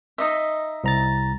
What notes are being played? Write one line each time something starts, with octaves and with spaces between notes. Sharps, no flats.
D#4 D#5 E5
C2 A#5 A6